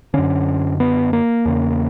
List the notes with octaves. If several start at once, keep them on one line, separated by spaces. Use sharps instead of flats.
F#2 D3 C#4
B3
A#3
E2 C#3